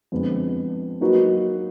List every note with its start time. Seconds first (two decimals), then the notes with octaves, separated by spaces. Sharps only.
0.12 F2 D3 G#3 B3
1.01 F#3 A#3 D#4 F#4 B4